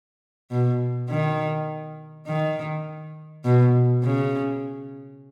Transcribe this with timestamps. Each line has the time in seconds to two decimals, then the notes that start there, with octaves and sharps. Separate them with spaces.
0.51 B2
1.10 D#3
2.27 D#3
3.45 B2
4.04 C#3